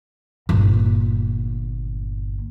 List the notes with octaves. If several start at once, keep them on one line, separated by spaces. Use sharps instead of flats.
G1 A#2